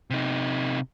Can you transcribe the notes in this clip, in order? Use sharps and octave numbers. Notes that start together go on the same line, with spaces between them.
C3 D#4